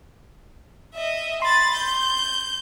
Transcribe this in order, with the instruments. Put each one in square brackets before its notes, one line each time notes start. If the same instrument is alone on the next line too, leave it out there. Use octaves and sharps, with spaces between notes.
[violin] D#5 E5
[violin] B5 A6 [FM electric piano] C6
[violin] G6